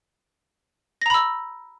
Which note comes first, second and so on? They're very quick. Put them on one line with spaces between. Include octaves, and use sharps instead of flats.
A#6 A#5 B5 E6